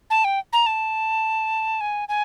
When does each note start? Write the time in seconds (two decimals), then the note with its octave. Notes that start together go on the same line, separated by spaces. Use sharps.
0.10 A5
0.24 G5
0.53 A#5
0.66 A5
1.81 G#5
2.09 G#5